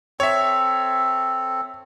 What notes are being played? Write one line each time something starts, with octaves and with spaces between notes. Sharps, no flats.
C4 A4 C#5 E5